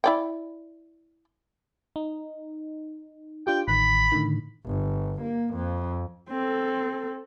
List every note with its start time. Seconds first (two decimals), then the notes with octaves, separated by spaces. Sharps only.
0.04 E4 D5 G5
1.96 D#4
3.47 D4 F4 G4 G5
3.68 A1 D#3 B5
4.12 A2 D3 D#3
4.65 G1
5.22 A#3
5.55 F2
6.30 C4 A4